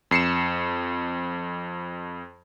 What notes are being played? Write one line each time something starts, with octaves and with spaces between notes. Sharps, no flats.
F2 C7 C#7 E7